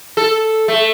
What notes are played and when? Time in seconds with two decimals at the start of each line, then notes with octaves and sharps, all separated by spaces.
0.17 A4
0.68 A3